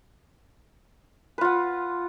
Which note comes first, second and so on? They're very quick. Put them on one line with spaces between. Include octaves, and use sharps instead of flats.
B4 F4 F#5